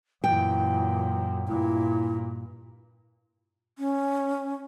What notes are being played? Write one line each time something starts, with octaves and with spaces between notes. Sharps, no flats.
F#2 A#2 E3 G5
G2 A#2 E4
C#4